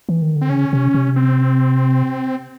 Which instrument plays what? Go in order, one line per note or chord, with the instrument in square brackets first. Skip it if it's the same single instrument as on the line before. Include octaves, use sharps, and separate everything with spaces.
[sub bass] E3
D#3
D3
[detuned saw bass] C4
[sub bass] C#3 [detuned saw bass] C#4
[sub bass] C3
C3
[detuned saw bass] C4